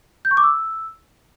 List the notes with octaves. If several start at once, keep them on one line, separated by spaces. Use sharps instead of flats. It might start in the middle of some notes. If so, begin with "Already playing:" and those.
G6
C#6
D6
E6